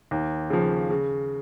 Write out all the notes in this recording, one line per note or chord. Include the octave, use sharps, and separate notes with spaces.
D#2
C#3 F3
C#3